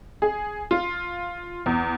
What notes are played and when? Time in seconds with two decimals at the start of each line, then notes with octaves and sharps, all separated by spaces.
0.22 G#4
0.71 F4
1.66 E2